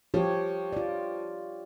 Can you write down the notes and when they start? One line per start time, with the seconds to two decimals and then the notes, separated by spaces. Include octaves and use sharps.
0.14 F3 G4 C#5
0.73 F4 D5